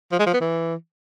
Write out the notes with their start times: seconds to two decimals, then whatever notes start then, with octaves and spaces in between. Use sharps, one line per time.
0.12 F3
0.19 G#3
0.26 F3
0.33 B3
0.41 E3